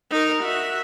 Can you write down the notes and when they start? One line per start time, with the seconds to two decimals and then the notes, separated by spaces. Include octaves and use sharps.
0.11 D#4 A#4
0.43 F#4 E5